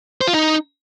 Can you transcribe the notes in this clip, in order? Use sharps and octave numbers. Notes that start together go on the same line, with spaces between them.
C5
F4
D#4